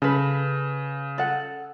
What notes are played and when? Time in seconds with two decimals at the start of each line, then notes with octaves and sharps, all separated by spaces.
0.02 C#3 A4 B4
1.18 A4 F#5